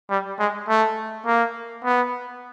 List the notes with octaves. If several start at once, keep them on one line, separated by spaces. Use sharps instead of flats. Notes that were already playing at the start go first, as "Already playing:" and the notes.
G3
G#3
A3
A#3
B3